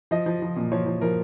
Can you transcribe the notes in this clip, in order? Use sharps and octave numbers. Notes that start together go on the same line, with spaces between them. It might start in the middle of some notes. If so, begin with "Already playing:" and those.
F3 D#5
F3
F3
A#2
F3 C#5
F3
F3 A#4